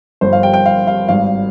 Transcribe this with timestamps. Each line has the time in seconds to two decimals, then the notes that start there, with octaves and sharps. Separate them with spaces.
0.21 G1 G2 F3 C5
0.33 F5
0.43 G5
0.54 G5
0.66 F5
0.87 F5
1.08 G#1 G2 G3 F5